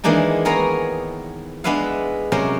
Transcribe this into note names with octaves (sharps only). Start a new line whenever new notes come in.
D#3 E3 G#3 A#3 D4 D#4
B3 G#4 A#4 C#5 A#5 C6
G#3 B3 D4 B4 E5 F5
C3 F#3 C#4 A#4 C5